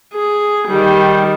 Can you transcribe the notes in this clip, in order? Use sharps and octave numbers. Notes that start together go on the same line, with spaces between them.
G#4
D#3 G3